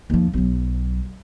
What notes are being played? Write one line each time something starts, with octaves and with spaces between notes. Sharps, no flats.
D#2 F3
B1 F#3